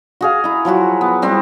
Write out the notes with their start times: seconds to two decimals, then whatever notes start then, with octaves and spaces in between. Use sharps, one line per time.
0.21 F#4 G#4 F5
0.44 E4 A#5
0.65 F3 F#3 E4 F#4
1.01 B3
1.22 G3 C4 E4